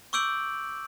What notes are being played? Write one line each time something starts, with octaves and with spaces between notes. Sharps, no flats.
C#6 D6 E6 G6 D7 F#7